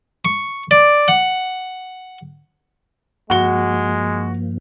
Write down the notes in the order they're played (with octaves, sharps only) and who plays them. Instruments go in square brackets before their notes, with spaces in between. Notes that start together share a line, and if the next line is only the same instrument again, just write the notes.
[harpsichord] C#6
D5
F#5
[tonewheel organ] G2 F3 A#3 [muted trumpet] G#3 [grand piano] F#4 G7